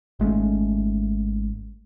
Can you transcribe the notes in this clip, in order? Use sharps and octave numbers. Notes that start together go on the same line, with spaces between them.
G#1 G#3 A3 C#4